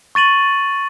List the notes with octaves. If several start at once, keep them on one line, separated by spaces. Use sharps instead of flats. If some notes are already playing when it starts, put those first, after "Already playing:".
C#6 A6 D#7 F#7